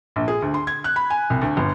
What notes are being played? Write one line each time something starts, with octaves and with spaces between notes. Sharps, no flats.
A#1
G#4
D2
C6
G#6
F#6
B5
G#5
C2
D2
G1